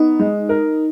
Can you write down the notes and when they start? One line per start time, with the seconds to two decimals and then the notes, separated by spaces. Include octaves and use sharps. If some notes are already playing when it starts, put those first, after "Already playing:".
Already playing: B3 D#4
0.19 G#3
0.49 A#4